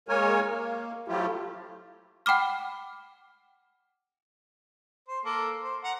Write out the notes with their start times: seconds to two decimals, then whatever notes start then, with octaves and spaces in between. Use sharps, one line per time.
0.09 G#3 A#3 A#4 C#5 G#5
0.50 A#3
1.08 F3 F#3 A3 E4 F4 G4
2.26 F#5 G5 B5 D6 F6
5.08 C5
5.25 A#3 A4
5.63 C5
5.84 F#5 A#5